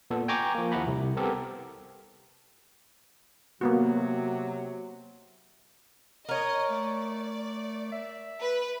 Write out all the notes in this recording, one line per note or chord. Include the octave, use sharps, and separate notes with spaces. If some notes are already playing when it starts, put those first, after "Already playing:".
A#2 B3 A4
G5 G#5 A#5 C#6 D6
F3 A#3
D#2 F3 E4 F#5 A#5 B5
C2 C3
B3 C4 G4 A4 A#4
C3 F#3 A#3 B3 F#4
A#4 C#5 D#5
A3 D5
E5
B4